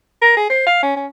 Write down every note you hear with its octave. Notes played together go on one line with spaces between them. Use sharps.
A#4
G#4
C5
F5
C#4
C#4